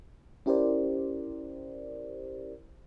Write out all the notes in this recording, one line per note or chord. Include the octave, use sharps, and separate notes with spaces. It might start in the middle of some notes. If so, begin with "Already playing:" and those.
C#4 E4 G4 A#4 C5 D5